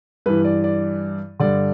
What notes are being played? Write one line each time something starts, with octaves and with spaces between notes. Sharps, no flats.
G2 E3 B4
D5
D5
G2 D3 D5